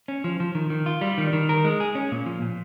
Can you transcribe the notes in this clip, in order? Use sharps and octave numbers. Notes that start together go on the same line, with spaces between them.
C#4
F3
F3
D#3
D#3
F4
G3
D#3
D#3
A#4
G#3
G#4
C#4
A#2
F3
A#2